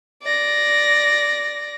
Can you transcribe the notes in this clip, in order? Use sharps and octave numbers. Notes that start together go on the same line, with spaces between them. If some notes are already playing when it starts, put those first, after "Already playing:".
D5 A#6